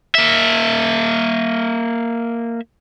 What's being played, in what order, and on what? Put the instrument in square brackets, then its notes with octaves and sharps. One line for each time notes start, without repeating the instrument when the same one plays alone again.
[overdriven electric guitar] A#3 E5